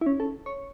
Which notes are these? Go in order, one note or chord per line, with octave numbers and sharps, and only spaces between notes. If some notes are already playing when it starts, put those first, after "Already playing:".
E4
C#4
A4
C#5